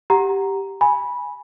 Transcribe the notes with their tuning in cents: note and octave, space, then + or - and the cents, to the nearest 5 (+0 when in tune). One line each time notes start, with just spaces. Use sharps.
G4 +0 F#5 +0 A#5 +0
G#5 +0 B5 -15